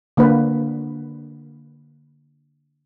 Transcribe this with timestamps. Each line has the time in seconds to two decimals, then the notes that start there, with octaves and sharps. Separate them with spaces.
0.17 D3 A#3 D4 B4